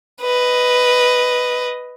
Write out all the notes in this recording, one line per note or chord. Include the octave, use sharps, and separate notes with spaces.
B4 D#5